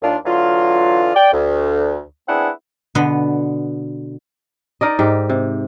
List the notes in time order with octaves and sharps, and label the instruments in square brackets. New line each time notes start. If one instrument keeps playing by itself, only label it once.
[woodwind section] D#2 D4 F4
D3 E3 F#3 F4
D5 G5
D2
B3 C4 D4 E4 G#4 F#5
[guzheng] B2 D3 B3 B4
[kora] D#4 A#4 D5 D#5
G#2 G4
C3